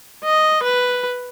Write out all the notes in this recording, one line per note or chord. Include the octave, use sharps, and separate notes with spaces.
D#5
B4